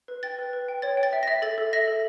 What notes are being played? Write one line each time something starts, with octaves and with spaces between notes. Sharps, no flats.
B4
G5 A6
B4
B4
G5
C#5 A6
G5
A6
E5
E5 A#6
A4 A6
A4
E5 A#6
A4